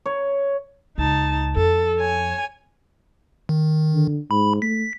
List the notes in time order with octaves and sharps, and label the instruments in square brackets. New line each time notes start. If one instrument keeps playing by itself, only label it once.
[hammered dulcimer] C#5
[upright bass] C#2 [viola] D#4 A5
[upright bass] F2 [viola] A4
[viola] C#5 G#5
[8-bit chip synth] D#3
[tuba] D3
[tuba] G#2 [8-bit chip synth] B5
[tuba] A3 [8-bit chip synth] B6